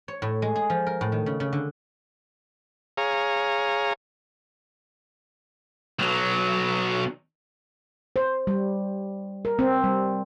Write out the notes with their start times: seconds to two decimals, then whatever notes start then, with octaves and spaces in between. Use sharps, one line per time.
0.08 C#5
0.22 A2
0.42 G#3
0.56 G#4
0.70 F3
0.87 A#4
1.01 A2
1.12 D#3
1.26 C#3
1.40 C#3
1.53 D3
2.97 G#4 C#5 F5 A#5
5.99 B1 F#3
8.16 C5
8.47 G3
9.45 A#4
9.59 C4
9.84 G3